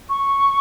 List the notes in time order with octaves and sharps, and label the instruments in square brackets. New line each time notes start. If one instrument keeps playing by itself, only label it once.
[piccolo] C#6